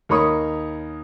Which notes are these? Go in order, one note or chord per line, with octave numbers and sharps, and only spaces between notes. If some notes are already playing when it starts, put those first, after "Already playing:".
D#2 A#4 C#5 B5 C#6 D#6